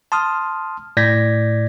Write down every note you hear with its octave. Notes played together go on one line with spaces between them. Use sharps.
A5 C6 D#6 F6
A2 D5 G6 G#6 A#6 B6